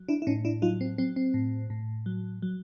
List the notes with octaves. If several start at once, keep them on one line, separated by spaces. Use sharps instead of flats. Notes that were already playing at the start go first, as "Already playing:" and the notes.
Already playing: F#3
D4 E4
E4
A2 C#4 D#4
D4 E4
F#3 D#4 F4
C4
F#3 C4
C4
A2
A2
F#3
F#3